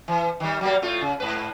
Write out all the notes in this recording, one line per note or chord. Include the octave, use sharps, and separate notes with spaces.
E3
D#3 G3
F#3 G3 A#3
A2 A3 F4
C#3
G#2 B4